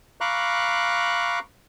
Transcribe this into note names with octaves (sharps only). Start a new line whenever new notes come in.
F5 A#5 B5 C#6 D6 F#6